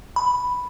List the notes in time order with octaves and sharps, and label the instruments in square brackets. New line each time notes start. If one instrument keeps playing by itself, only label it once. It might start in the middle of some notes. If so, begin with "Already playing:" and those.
[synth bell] B5